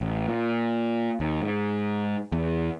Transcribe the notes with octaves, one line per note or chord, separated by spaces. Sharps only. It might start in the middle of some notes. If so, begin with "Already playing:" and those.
A1
A#2
D#2
G#2
E2